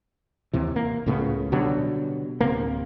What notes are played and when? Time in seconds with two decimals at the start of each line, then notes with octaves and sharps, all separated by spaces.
0.53 D#2 C3 E3
0.76 A#3
1.06 C#2 A2 C#3 B3
1.52 B2 D3 F#3 G3
2.41 D1 C3 A#3